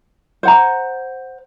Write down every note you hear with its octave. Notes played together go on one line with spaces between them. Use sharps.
C5 F#5 A#5